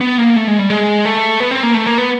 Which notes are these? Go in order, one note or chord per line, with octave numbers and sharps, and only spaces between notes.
B3
A#3
A3
G#3
G3
G#3
A3
B3
C4
A#3
A3
A#3
B3